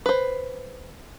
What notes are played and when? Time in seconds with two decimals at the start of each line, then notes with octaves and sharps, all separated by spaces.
0.06 B4 C5